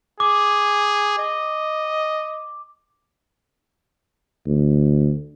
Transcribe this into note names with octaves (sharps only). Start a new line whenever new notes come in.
G#4 D6
D#5
D2